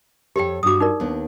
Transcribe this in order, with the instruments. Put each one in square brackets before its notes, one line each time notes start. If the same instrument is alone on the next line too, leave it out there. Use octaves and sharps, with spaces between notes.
[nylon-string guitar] F2 A4 C#5 [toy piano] G4 G5
[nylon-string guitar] G2 F#4 [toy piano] D6 D#6
[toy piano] D#4 A#4 D5
[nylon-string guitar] D#2 B3 D4